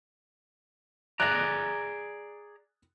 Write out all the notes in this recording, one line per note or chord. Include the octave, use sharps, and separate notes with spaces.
G#4 D5 A#5 F#6 A#6